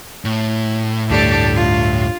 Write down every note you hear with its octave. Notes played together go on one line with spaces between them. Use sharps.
A2
D2 G2 D4 G4 A4
F4